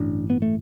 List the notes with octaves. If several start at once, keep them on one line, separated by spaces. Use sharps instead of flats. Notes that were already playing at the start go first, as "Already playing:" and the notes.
Already playing: A1 G2 D3 D4
B3
A3